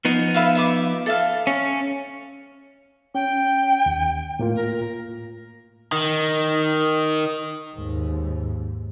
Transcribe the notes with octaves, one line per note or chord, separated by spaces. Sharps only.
F3 B3 D#4
B4 E5 F5
E5 B5 D6
A4 E5 F5
C#4
C#4 G5
D#2
A2 A#3 F4
A#4
D#3
D#2 G#2